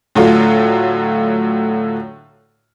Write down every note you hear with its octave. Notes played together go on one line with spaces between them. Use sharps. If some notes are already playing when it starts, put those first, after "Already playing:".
A2 D3 F#3 A3 F4